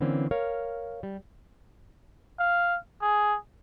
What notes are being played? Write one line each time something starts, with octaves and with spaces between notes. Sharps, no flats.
D3 E3 A#3 C4 C#4
A#4 C#5 F5
G3
F5
G#4